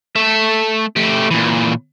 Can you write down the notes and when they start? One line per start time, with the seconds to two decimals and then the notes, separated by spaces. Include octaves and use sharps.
0.16 A3 E5
0.96 A3 G4
1.31 A#2 E3